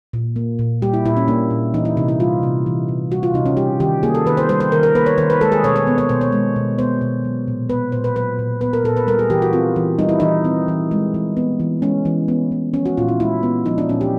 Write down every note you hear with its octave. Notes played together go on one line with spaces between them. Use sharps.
A#2
A#3
A#2
G3 G4
E4
A#2 E4
C#4
A#3 D4
A#2
E3 D#4
E4
C3 D#4
E4
G3 F4
C3
E3
C3
G3 F#4
F4
C3 D#4
C#4
G3 G4
D#3 G4
A#3 G#4
A4
D#3 B4
C5
G3 C5
C5
D#3 A#4
A#4
A#3 B4
C#5
D#3 C5
B4
G#3 A4
G#4
B2 C#5
C#5
B3
C#5
B2 C5
C#5
G#3
B2
B3 C5
B2
F#3
A#2
B3 B4
A#2 C5
B4
F#3 B4
A#2
B3 B4
A#4
A#2 A4
B4
G3 A#4
G#4
E3 G4
F#4
C4 F4
E3
G3 D#4
E4
E3 D#4
C4
E3
G#3
E3
B3
E3
G#3 C#4
E3
B3
E3
F3 C#4
F#4
A#2 F4
E4
G#3 E4
B3
F3 D#4
D4
A#2 C#4
G4